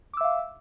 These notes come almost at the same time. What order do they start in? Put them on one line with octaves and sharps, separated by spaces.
D6 E6 E5 F5